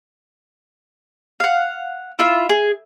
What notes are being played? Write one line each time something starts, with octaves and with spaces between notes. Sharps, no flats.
F5 F#5
E4 F4 E5
G#4